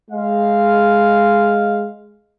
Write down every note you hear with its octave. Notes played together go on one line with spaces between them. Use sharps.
G#3 F5